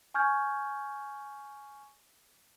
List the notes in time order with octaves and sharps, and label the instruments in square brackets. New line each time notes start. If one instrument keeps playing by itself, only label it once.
[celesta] G#5 C#6 F6 G6 G#6